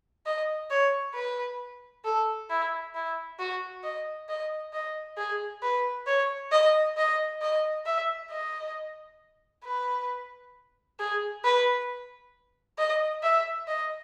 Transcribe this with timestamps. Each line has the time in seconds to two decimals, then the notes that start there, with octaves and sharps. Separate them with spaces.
0.26 D#5
0.70 C#5
1.15 B4
2.05 A4
2.50 E4
2.95 E4
3.39 F#4
3.83 D#5
4.29 D#5
4.73 D#5
5.18 G#4
5.63 B4
6.07 C#5
6.52 D#5
6.97 D#5
7.42 D#5
7.86 E5
8.31 D#5
9.65 B4
11.00 G#4
11.45 B4
12.78 D#5
13.23 E5
13.68 D#5